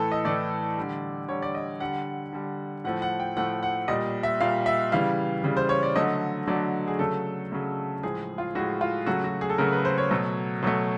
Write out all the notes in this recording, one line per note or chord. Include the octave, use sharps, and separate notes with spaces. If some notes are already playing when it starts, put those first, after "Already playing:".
Already playing: A2 E3 A3 A4
D#5
A2 E3 A3 D5
D3 G3
D3 G3 C#5
D5
D#5
D3 G3 F#5
D3 G3
A2 F3 A3 F#5
F#5
G5
A2 F3 A3 F#5
F#5
A#2 G3 D#5
E5
A#2 G3 F5
E5
C#3 E3 G3 F5
C#3 E3 G3
C5
C#5
D5
D3 F#3 A3 D#5
D3 F#3 A3 D5
G#4
C#3 F#3 A3 A4
C#3 F#3 A3
A2 F3 G#3 G#4
F4
A2 F3 G#3 F#4
F4
C#3 F#3 A3 F#4
F#4
G#4
A4
C#3 F#3 A3 A#4
B4
C5
C#5
B2 F#3 A3
B2 F#3 A3